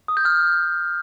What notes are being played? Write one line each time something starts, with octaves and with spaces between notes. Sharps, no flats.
D#6
G6
F6